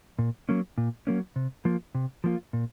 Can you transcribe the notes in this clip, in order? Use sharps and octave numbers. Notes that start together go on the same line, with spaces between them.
A#2
F#3 A#3 C#4
A#2
F#3 A#3 C#4
C3
F3 A#3 F4
C3
F3 A#3 F4
A#2